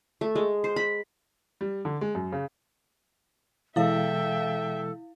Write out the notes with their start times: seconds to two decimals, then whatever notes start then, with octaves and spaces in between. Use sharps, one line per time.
0.21 A3
0.35 G#3
0.64 C5
0.76 B5
1.61 G3
1.85 D3
2.01 G#3
2.15 F#2
2.32 C#3
3.76 B2 E3 G#3 E4 A4 E5 F5 G5